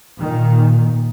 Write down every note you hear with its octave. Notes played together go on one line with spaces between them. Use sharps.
A#2 D#3